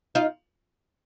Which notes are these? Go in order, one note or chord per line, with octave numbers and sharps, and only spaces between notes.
D#4 F4